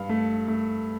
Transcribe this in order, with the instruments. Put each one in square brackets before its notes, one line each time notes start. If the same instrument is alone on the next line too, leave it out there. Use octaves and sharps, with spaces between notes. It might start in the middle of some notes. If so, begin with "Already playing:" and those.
Already playing: [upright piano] G2 F5
A3
A3